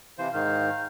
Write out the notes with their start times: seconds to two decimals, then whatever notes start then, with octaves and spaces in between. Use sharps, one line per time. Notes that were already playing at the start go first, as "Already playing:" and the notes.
0.18 C3 E3 C5 F5
0.34 G#2 D#3 F5 G6